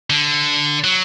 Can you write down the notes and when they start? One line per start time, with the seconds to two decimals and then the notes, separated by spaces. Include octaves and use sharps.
0.10 D3
0.84 F#3